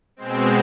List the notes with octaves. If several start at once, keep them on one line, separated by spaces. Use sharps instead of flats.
B2 G#3 C4